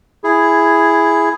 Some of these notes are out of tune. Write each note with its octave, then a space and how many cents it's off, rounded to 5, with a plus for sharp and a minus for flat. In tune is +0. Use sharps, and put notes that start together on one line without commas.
E4 +5 G#4 +0